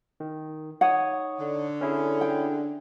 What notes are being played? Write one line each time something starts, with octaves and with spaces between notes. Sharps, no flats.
D#3
D#4 C#5 F#5 D#6
D3
C#4 E4 G#4
G5